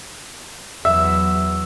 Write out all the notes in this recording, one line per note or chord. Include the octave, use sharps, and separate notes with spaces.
E2 F#3 E5 E6